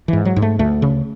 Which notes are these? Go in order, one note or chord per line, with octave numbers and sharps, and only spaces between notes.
G#2 E3
F#3
G#2
A3
D2 A3
C#3